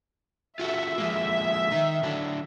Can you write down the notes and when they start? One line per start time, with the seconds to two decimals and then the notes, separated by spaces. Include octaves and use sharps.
0.59 F4 F#4 A4 E5
0.98 F3 G#3 A#3
1.71 D#3 D#4
2.03 D3 F#3 D4